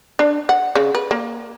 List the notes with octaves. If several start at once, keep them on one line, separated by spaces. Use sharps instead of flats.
D4
F#5
C#3
B4
A#3